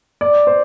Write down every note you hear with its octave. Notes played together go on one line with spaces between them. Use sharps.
D5
C5